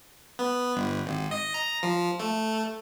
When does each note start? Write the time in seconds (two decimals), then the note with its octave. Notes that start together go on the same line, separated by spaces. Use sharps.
0.39 B3
0.77 G1
1.07 G#1
1.31 D#5
1.54 A#5
1.83 F3
2.20 A3